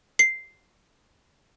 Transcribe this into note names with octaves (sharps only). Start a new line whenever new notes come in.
C7